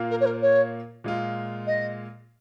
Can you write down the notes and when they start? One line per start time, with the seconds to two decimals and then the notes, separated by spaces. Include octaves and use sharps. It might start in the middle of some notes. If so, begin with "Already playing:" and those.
Already playing: A#2 A#3 F4
0.10 A#4
0.21 C#5
0.26 A#4
0.42 C#5
1.04 A#2 G#3 F4
1.67 D#5